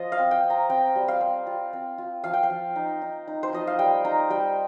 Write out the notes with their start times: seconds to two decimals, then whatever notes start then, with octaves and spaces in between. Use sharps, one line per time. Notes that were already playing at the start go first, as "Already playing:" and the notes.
Already playing: F3 F4 C5 D#5
0.12 F5
0.18 C4
0.31 G5
0.44 C4
0.50 A#5
0.70 C4 G5
0.96 G3
1.08 F5
1.21 C4
1.47 F4
1.73 C4
1.98 F4
2.24 F3 F5
2.34 G5
2.43 F5
2.50 F3
2.76 D#4
3.02 D#4
3.28 D#4
3.43 C5
3.53 F3 D#5
3.67 F5
3.79 G3 G5
4.05 D#4 A#5
4.30 G3 G5